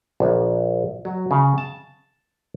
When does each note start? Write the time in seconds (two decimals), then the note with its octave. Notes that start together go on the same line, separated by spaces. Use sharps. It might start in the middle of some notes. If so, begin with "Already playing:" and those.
0.20 A#1
1.05 F#3
1.31 C#3
1.58 A5